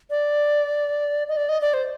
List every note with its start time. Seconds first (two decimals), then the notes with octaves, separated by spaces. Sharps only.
0.10 D5
1.28 D#5
1.37 D5
1.49 D#5
1.61 D5
1.73 C5